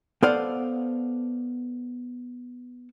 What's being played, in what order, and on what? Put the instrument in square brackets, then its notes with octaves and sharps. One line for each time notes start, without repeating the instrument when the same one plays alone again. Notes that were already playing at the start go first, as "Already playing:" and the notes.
[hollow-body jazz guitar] B3 A4 C5 D5 F5 F#5